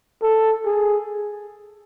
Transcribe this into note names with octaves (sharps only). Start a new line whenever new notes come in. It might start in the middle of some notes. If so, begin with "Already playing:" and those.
A4
G#4